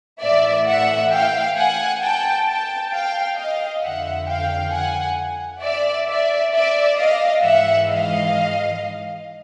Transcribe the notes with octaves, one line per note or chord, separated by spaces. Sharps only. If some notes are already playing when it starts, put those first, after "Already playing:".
A2 E3 D5 E5
E5 F#5
F5 G5
F#5 G#5
G5 A5
G5 A5
F5 G5
D#5 F5
F2 D3 E5 F#5
F5 G5
F#5 G#5
D5 E5
D5 E5
D5 E5
D#5 F5
G#2 E3 E5 F#5
D#5 F5